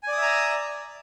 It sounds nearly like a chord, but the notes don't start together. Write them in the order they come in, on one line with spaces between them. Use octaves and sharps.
G#5 D5 D#6 E5 A#5